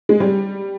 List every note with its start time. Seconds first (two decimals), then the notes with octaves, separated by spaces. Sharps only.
0.09 G#3
0.20 G3